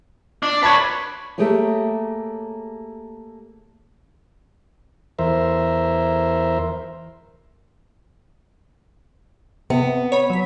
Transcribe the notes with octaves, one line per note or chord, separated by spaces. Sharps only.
D4
B4 C#5 A5 B5 G#6
A3 A#3 G4 G#4 C#5
E2 A#4 C5 E5
C3 B3
C#5 B5
F#3 B6